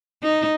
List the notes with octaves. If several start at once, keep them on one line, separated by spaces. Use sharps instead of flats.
D#4